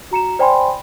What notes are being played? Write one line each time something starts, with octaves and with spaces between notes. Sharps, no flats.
F#4 A#5 C#7 E7
C5 D5 G5 G#5 B5 C6